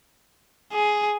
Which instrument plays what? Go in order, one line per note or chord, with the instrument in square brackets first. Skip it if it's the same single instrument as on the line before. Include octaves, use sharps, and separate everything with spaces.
[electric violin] G#4